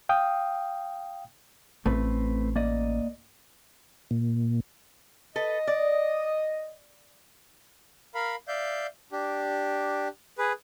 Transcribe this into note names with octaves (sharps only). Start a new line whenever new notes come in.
F5 G5 D#6
A1 A3 C4 B4
A#3 D5 D#5
A#2
A4 B4 D#5
D5
A#4 F5 B5
D5 E5 F5 G6
D4 G4
G#4 B4